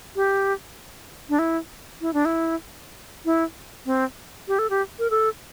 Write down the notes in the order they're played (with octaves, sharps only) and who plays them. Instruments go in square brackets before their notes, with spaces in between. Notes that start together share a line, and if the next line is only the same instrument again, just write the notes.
[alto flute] G4
D4
E4
E4
D4
E4
E4
C4
G4
A4
G4
A#4
A4